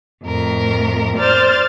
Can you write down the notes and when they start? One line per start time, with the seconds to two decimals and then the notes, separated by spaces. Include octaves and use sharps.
0.24 F2 A2 A#4
1.17 C5 D5 F6 A6